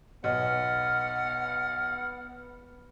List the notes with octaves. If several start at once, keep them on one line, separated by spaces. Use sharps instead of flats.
B1 B3 F#5 F6